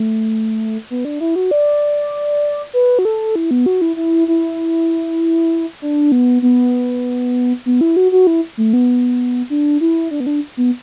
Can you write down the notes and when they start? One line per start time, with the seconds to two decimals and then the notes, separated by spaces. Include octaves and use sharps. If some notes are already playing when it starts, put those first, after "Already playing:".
Already playing: A3
0.90 B3
1.05 D4
1.21 E4
1.36 F#4
1.51 D5
2.74 B4
2.99 F#4
3.05 A4
3.35 E4
3.51 B3
3.66 F#4
3.81 E4
3.96 E4
4.28 E4
5.82 D4
6.12 B3
6.42 B3
7.66 B3
7.81 E4
7.96 F#4
8.12 F#4
8.27 E4
8.57 A3
8.73 B3
9.50 D4
9.81 E4
10.11 D4
10.20 B3
10.26 D4
10.57 B3